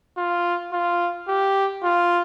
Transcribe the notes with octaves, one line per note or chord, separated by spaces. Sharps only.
F4
F4
G4
F4